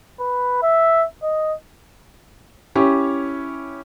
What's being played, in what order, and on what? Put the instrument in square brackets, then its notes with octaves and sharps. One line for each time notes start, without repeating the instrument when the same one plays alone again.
[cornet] B4
E5
D#5
[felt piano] C#4 E4 G4 C#5